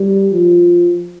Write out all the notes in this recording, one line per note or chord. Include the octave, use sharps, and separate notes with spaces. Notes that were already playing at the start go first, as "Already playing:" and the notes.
Already playing: G3
F3